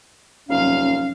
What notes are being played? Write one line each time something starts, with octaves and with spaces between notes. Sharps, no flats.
D#1 F2 C3 F#3 C#4 F5